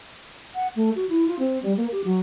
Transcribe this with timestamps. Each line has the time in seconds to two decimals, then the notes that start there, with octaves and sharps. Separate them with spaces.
0.55 F#5
0.76 A3
0.96 F#4
1.09 E4
1.28 F4
1.39 C4
1.63 G3
1.77 A#3
1.92 G4
2.04 F#3